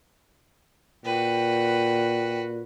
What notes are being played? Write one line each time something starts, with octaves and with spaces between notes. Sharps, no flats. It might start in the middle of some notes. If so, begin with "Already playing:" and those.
A#2 F#4 B4 G5